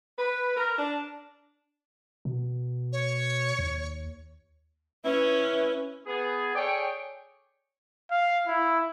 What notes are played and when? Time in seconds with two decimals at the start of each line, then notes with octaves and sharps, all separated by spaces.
0.19 B4
0.56 A#4
0.78 D4
2.25 B2
2.93 C#5
3.59 D#2
5.05 C#4 E4 B4
6.07 B3 G#4
6.55 G#4 A4 C#5 D5 G5
8.11 F5
8.47 E4